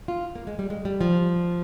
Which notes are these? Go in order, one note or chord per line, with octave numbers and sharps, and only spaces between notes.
F4
A#3
G#3
G3
G#3
G3
F3